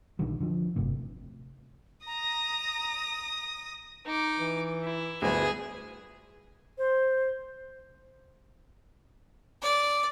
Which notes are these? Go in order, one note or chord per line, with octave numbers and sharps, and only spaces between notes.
A#1 D3 D#3 G3
D3 F3
D1 G1 D2 C3
A#5 D#6 A#6
D#4 D6
E3
E4
G1 D2 G#4 B4
C5
D5